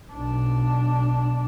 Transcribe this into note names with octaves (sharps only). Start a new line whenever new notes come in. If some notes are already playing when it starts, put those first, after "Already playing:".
B1 D4